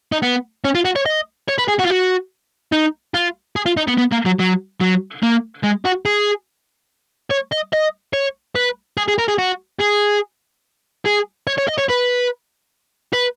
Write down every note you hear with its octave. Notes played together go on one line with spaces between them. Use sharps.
D#4
B3
C#4
F4
F#4
C#5
D#5
C#5
B4
G#4
F#4
F4
F#4
D#4
F4
G#4
F4
D#4
B3
B3
A#3
F#3
F#3
F#3
A#3
G#3
F#4
G#4
C#5
D#5
D#5
C#5
B4
G#4
G#4
A#4
G#4
F#4
G#4
G#4
C#5
C#5
D#5
C#5
B4
B4